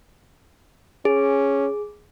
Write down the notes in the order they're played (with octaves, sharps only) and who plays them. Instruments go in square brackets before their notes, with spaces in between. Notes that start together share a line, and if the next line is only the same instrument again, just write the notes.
[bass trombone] C#4 [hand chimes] G#4